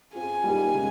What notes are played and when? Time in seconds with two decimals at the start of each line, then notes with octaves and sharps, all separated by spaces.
0.13 C4 F4 G#4 G#5
0.44 G3 A#3 D#4 A#4
0.74 C#3 G#3 D#4